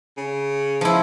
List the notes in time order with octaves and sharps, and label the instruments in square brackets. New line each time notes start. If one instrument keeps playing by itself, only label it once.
[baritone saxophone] C#3
[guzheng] F3 E4